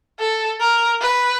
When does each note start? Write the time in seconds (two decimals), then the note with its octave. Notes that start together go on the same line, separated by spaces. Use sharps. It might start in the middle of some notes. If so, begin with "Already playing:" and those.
0.20 A4
0.60 A#4
1.01 B4